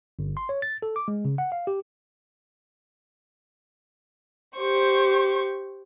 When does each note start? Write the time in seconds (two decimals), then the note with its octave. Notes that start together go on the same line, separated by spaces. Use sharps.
0.19 G1
0.37 C6
0.49 C#5
0.62 A6
0.82 A4
0.96 D6
1.08 G#3
1.25 C#3
1.38 F#5
1.52 F5
1.67 G4
4.56 G4 C5 C#6